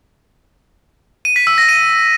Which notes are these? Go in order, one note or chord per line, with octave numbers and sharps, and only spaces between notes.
D#7
B6
E6
A#6
D#7